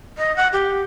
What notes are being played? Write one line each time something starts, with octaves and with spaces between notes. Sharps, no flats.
D#5
F#5
G4